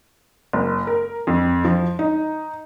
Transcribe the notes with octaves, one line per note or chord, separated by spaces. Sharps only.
F#1
A#4
F2
F3
D#4